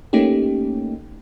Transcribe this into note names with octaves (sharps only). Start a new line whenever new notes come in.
A3 A#3 C#4 D#4 G4